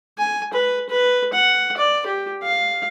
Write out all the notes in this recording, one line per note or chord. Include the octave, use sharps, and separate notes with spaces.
G#5
B4
B4
F#5
D5
G4
F5